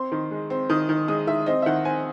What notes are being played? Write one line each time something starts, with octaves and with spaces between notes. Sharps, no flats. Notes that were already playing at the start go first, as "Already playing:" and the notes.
Already playing: C4 C6
D#3
G#3
C4
D#3 D#6
D#3
G#3 D#6
D#3 E5
C4 D#5
E5
D#3 F#5
C4 G#5